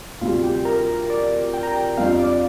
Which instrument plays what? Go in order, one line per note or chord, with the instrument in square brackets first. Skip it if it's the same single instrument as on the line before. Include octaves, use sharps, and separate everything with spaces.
[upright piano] D2 C3 G3 [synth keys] F4
[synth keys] G4
A#4
D5
G5
A#5
G5
[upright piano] F2 F3 D4 G4 [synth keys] F5
[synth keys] D5